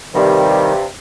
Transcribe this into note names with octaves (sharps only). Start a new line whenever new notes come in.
G2 C3 D#3 G3